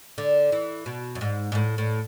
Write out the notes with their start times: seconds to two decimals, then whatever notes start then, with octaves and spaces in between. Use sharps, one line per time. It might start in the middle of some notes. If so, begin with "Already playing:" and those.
0.18 D3
0.52 E3
0.86 B2
1.15 F#2
1.21 G#2
1.52 G#2
1.55 A2
1.78 A2